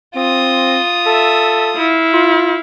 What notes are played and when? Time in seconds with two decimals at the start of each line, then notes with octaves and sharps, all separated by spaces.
0.16 C4 F4 D#6
1.06 A4 E5
1.76 E4 F5
2.13 F4